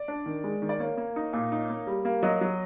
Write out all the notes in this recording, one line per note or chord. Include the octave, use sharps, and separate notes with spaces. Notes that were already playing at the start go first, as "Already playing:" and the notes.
Already playing: D5
D4
D#3
G#3
D#3
D5
A#3 C#5
A#3
D#4
A#2
D#4
A#3
G3
A#3
F#3 D#5
F#3